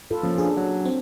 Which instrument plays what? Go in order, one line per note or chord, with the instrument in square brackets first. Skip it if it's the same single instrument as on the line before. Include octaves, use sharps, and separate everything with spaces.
[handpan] F4 A4 B4
[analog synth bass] F3 [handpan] A#3 C#4
[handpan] D4 [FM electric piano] G#4
[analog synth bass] F#3
[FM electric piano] C4